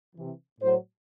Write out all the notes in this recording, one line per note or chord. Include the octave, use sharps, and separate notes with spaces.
C3 E3
A2 F#3 C5